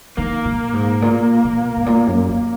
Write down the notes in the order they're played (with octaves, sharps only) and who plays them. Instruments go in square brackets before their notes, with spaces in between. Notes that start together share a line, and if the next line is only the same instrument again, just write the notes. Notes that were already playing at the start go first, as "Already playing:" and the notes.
[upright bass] D#3 [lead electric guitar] A#3
[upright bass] A#2
G#2
A#2
B2
G#2
A#2
F#2
E3